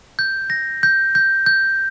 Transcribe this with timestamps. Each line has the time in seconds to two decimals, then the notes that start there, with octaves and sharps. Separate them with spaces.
0.19 G6
0.50 A#6
0.83 G6
1.15 G6
1.46 G6